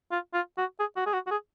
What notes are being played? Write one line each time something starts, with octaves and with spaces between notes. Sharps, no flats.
F4
F4
F#4
G#4
F#4
G#4
F#4
F#4
G#4